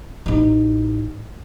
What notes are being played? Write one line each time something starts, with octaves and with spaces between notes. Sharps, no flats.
A1 D#4